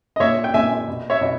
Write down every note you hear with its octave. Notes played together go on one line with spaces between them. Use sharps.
D#5
A#2 C#5 E5
G5
A#2 E5 G#5
B2
C#5 E5
B2